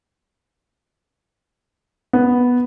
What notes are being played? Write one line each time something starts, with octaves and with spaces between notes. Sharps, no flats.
B3